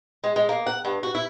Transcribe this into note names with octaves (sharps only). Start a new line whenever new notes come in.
G#3
G#3
A#3
F#5
G2
F#4
E4